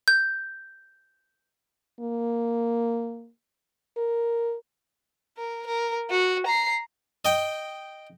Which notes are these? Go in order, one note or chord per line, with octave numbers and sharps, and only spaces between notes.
G6
A#3
A#4
A#4
A#4
F#4
A#5 C7
D#5 G5